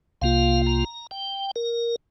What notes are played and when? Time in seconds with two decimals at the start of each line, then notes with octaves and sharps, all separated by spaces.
0.22 C2 C3 A#3 F4 F5
0.67 A#5
1.11 G5
1.56 A#4